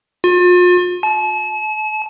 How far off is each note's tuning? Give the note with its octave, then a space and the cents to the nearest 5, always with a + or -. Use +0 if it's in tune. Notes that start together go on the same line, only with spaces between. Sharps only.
F4 +40
A5 -40